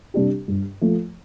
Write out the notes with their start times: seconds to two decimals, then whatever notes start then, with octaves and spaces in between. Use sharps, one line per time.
0.14 C3 G3 D4 G4
0.48 G2
0.81 F3 A3